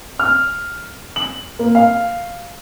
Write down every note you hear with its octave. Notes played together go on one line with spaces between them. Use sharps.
F6
F#7
A#3
F5